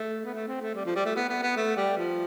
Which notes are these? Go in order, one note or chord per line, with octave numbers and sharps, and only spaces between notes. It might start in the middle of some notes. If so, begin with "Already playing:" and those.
Already playing: A3
B3
A3
C4
A3
G3
F3
G3
A3
B3
B3
B3
A3
G3
F3